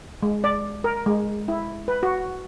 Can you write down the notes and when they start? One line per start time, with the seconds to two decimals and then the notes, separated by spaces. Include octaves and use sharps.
0.23 G#3
0.44 D5
0.84 A#4
1.06 G#3
1.48 E4
1.88 B4
2.03 F#4